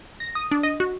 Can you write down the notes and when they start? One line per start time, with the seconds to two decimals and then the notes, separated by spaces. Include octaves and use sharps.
0.20 A#6
0.35 D#6
0.51 D4
0.63 D#5
0.80 F#4